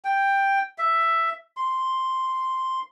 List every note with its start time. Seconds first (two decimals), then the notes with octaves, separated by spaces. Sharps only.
0.05 G5
0.78 E5
1.57 C6